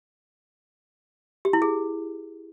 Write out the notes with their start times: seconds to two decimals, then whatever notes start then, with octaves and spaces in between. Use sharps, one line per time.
1.45 G4
1.53 E4
1.62 G#4